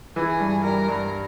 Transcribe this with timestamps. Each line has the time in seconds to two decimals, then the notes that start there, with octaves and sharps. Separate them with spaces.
0.16 E3 G#4
0.40 G2
0.64 G3 A#4
0.88 G2